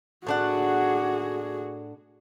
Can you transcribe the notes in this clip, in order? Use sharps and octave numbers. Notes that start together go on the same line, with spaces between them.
A2 D4 F#4 G#4 F#5